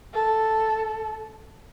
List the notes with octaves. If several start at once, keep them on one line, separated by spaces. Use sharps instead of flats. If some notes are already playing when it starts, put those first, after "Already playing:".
A4